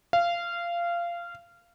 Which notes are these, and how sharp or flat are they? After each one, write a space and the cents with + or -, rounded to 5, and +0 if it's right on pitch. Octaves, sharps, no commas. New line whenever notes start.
F5 -20